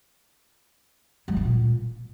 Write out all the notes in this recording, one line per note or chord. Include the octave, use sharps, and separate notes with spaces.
G3
G2
A#2